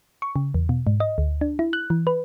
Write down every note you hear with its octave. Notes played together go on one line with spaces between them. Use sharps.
C#6
C#3
E2
B2
G#2
D#5
D2
D4
E4
F#6
E3
B4